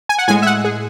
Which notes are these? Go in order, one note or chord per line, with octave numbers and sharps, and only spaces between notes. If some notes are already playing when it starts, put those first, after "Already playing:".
G#5
F#5
A2 G#3 G#5
E5
F#5
G#4